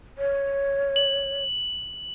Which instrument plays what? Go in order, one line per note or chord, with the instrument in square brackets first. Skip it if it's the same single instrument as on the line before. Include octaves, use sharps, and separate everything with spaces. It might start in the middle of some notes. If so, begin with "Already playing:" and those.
[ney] C#5
[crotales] F#7